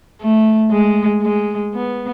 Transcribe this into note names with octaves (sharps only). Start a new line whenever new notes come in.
A3
G#3
G#3
B3